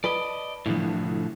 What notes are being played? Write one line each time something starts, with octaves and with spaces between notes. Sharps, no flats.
B4 D5 D#5 A5
C2 A2 D3 E3 F3